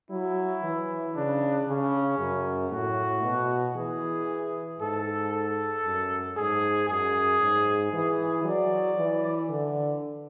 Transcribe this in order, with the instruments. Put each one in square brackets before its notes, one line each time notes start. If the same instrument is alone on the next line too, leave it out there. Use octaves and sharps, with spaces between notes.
[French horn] F#3 [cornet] E4
[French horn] E3
[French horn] C#3 [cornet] D4
[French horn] C#3 [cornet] C#4
[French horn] F#2
[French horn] A2 [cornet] F#4
[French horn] B2
[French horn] E3 [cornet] G#4
[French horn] G#2 [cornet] A4
[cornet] A4
[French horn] F#2
[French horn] G#2 [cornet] G#4
[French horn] F#2 [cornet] G#4
[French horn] G#2
[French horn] E3 [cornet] G#4
[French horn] F#3 [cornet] D5
[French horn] E3
D3